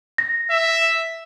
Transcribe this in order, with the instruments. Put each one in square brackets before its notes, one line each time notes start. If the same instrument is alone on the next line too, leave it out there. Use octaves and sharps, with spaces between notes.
[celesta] A#6
[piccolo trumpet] E5